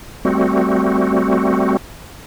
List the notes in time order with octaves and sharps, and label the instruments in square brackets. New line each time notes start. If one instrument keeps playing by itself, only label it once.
[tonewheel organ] G3 A3 C4 F#4